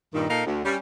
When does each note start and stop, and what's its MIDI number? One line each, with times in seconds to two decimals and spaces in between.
0.14 0.25 43
0.14 0.25 46
0.14 0.25 51
0.29 0.44 46
0.29 0.44 63
0.29 0.44 69
0.29 0.44 70
0.29 0.44 77
0.46 0.61 38
0.64 0.76 55
0.64 0.76 61